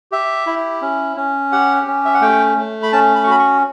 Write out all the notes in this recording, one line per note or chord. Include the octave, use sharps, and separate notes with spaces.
G4 E5
E4
C#4
C#4
G4 F#5
C#4
E5
F#5
A3 G5
A3
B5
C#4 A5
B5
C#6
F#4 B5
C#6